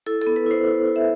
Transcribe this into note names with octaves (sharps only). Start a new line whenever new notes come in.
E4 A4
A4
B3
B4
E4 C5
E4
E4
E5